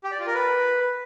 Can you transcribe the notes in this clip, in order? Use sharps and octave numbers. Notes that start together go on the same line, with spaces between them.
G4
D5
F4
A#4
B4